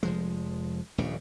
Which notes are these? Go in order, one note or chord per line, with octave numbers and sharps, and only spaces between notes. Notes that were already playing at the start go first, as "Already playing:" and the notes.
F1 F3 G#3
D#1 A#1 G2 C#3